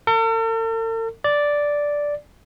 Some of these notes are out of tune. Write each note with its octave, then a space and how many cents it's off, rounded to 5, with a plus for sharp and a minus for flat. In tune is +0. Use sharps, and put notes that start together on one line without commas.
A4 +45
D5 -5